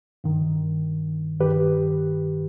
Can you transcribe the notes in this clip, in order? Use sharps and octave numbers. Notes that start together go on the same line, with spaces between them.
G2 D#3
G2 D#3 G4 B4